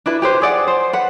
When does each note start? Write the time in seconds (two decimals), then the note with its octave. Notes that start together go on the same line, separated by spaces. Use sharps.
0.06 D4 E4 B4
0.22 G4 B4 C5
0.42 G#4 D5 F#5
0.68 C5
0.93 B4 F#5